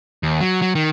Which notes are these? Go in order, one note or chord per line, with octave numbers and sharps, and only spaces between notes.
D#2
F#3
F#3
D#3